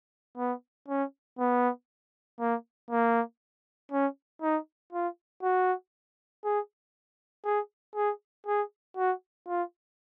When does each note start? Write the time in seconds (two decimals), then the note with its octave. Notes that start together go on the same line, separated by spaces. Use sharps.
0.38 B3
0.89 C#4
1.39 B3
2.40 A#3
2.91 A#3
3.92 C#4
4.42 D#4
4.93 F4
5.43 F#4
6.45 G#4
7.45 G#4
7.96 G#4
8.47 G#4
8.97 F#4
9.48 F4